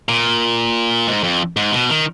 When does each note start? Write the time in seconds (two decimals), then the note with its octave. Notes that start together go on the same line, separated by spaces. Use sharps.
0.09 A#2
1.07 G#2
1.24 F2
1.57 G#2
1.72 B2
1.89 D#3